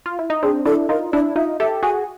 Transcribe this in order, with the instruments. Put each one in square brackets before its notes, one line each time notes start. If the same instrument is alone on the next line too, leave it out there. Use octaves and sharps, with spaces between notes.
[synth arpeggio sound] F4
E4
D#4
[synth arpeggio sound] C4 D4 [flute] G#4
[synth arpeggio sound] D4 E4 [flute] A4
[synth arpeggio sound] D#4 F4 [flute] A#4
[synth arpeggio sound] D4 E4 [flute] D5
[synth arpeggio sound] D#4 F4 [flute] E5
[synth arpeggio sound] G4 A4 [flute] E5
[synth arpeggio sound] F#4 G#4 [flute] G#5